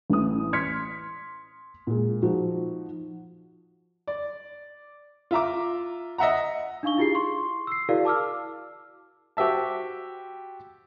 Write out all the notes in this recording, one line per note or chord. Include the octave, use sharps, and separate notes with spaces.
A1 A2 D#6
C6 F6 G#6 B6 C#7
A#2 G#3
F3 D#4 F#4
D5
F4 E5 A#5 D6
D#5 E5 F#5 A#5
D4 D#4 F5 C#6 G7
E4 F4 G4 G#4 C7
C6 C#6
E6 C7
E4 F#4 G#4 A#4 D5 F5
A5 D6 E6 F6
F#4 G4 C5 E5 A5